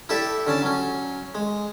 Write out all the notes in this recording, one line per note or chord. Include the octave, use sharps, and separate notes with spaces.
E4 G4 A4 D5 E5
D3 C#4 A5
F#3 C#4
G#3